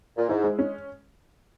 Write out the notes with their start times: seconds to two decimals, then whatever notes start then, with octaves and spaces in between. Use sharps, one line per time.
0.17 A#2
0.29 G#2 E4
0.44 G#3
0.59 C#4